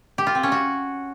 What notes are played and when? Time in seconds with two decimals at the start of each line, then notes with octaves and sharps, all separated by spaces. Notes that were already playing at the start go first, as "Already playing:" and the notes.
0.18 G4
0.27 F4
0.35 C4
0.43 C#4
0.52 F#4